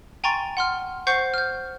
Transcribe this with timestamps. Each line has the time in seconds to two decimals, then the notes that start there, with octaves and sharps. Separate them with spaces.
0.24 G5 G#5 A#5 C6 C#6 A6
0.57 F#5 C6 F6
1.07 C5 F#5 C#6 G6 C7
1.34 F6 G6